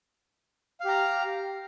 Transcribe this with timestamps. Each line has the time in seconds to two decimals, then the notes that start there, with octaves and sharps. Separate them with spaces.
0.80 F5
0.84 G4
0.89 A#5